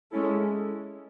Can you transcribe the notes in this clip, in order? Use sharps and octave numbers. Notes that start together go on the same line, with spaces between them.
G#3 C#4 E4 A4